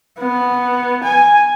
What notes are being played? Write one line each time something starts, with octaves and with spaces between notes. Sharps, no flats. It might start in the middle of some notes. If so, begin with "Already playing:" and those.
B3
G#5